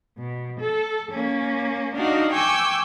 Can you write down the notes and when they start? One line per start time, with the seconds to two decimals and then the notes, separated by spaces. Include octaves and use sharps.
0.17 B2
0.60 A4
1.11 A#3 C#4
1.95 D4 D#4 F#4 F5 F#5
2.31 G5 G#5 C#6 D6 E6 G6